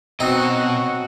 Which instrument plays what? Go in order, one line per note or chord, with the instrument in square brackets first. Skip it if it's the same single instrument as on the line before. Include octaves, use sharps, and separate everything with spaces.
[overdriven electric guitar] B2 D#5 [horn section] F#3 F#4 [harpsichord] C4 D#4